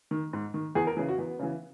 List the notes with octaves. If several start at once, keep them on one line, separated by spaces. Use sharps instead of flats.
D#3
G#2
D#3
E2 G#4
A#4
C#3 E3 G#4
F#4
E2 B3
C#3 E3